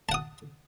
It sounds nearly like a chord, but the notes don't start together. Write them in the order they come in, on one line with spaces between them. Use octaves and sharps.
A5 F#5 D#6